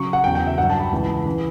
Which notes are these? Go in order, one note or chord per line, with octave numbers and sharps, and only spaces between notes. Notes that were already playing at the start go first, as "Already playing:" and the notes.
Already playing: C#3 F#3 C#6
F#5
E2 C#3 F#3 G5
G5
E5
G2 F#3 F#5
A5
B5
C#2 C#3 E3
C#3 E3